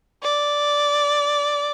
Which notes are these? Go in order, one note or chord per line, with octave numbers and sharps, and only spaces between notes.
D5